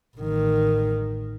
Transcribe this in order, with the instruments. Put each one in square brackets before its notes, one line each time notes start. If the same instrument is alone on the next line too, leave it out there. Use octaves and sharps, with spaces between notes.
[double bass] A1 D#3